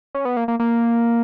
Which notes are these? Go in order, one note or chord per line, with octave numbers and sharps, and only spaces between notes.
C#4
B3
A#3
A#3
A#3